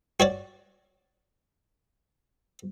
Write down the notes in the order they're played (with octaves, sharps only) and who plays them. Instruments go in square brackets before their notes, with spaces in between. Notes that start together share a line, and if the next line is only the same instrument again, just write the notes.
[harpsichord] F#4 C#5 D5